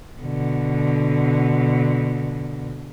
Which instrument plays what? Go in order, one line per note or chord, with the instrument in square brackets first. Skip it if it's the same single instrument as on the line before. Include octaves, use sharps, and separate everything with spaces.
[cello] B2 D3